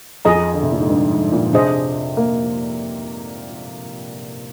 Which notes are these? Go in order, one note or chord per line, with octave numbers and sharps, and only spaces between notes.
F2 G#4 D#5 A#5
D3
C3
A#2
G#2
G2
G#2
A#2
C3 D4 G#4 C5 D#5
A#3